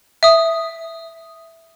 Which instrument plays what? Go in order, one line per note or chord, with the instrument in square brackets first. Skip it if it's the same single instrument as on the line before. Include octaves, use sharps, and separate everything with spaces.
[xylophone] E5 D#6